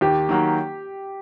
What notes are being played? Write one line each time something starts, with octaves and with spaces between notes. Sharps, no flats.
D#2 G4
D#3 F#3 A#3